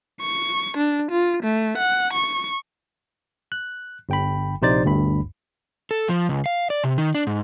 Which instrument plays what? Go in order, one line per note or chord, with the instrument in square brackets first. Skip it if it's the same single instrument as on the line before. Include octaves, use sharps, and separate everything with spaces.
[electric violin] C#6
D4
F4
A3
F#5
C#6
[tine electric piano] F#6
G1 G5 B5
A#1 C3 D#4 C5 D5 A6
G1 D2 G2 B5
[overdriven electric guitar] A4
F3
C#2
F5
D5
C3
D#3
D4
G#2